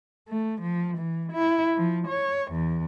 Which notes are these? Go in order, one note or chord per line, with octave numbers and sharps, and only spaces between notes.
A3
F3
E3
E4
F3
C#5
E2